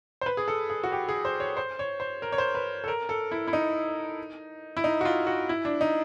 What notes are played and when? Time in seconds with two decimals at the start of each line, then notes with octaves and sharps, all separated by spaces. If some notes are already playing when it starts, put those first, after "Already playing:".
0.21 C5
0.26 B4
0.37 G#4
0.48 A4
0.70 G#4
0.84 F#4
0.92 G4
1.08 G#4
1.25 C5
1.40 C#5
1.57 C5
1.79 C#5
2.00 C5
2.22 A#4
2.32 C#5
2.38 C5
2.55 B4
2.84 A4
2.88 A#4
3.09 A4
3.31 E4
3.47 E4
3.53 D#4
4.77 E4
4.84 D#4
5.01 F#4
5.05 F4
5.27 F#4
5.49 E4
5.65 D4
5.81 D#4